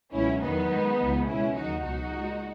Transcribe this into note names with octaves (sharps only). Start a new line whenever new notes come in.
C#2 B2 F#3 C#4 E4
E2 D#3 F#3 B3 D#4
F#2 D#3 G#3
C#2 C#3 E3 G#3
C#2 B2 G#3 C#4 E4
D#2 C#3 F#3 D#4 F#4
C#2 B2 F#3 D#4 F#4
A#2 G#3